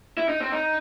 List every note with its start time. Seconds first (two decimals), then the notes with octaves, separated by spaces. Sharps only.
0.17 E4
0.29 D#4
0.40 C4
0.52 D#4